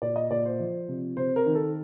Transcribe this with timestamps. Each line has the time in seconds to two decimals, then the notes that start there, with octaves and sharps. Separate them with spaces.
0.02 A#2 D5
0.16 D#5
0.31 A#2 D5
0.45 C5
0.60 F3
0.88 C3
1.17 C3 C5
1.36 A#4
1.46 D#3
1.55 A4